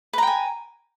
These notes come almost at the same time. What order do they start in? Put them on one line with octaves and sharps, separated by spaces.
B4 A#5 G5 G#5